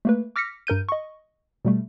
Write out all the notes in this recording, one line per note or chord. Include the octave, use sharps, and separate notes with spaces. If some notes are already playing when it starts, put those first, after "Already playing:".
A3 A#3 B4
D6 F6 A#6 B6 C#7
G2 A#4 G6 D#7
D#5 C#6
B2 G3 A3